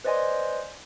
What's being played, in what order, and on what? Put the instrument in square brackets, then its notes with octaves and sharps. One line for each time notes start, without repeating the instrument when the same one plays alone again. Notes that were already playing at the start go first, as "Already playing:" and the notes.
[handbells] B4 C5 D5 D#5 G#5 C6